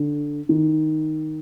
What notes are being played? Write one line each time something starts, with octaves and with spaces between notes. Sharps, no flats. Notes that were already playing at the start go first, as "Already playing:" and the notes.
Already playing: D3
D#3